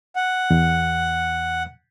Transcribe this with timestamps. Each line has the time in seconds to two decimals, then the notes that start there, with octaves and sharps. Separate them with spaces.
0.16 F#5
0.50 E2